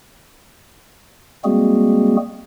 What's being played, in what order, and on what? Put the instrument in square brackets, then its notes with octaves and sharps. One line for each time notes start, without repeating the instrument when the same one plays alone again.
[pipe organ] G3 G#3 A#3 C4 F#4 G#4